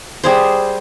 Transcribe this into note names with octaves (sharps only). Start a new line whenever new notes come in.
G3 G#4 C5